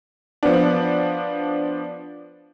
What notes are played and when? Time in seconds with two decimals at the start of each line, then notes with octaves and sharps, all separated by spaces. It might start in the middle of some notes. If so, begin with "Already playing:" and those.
0.43 F3 B3 D4